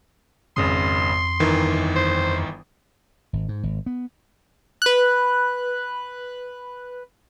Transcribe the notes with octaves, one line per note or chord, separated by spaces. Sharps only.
G#1 F2 C#3 C6 D#6
G1 D#3 E3
C5
G#1
G#2
G#1
B3
B4 F#6